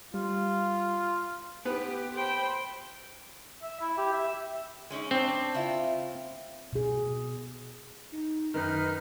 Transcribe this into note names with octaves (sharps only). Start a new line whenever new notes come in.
G3 F4
B3 G4 B4
C5 G5 B5
E5
E4
G4
E5
G#3 C#4 D#4
C4 D4
C#3 E4 F4
B2 G#4
D#4
F#2 D#3 D#4 B4 A#5 F6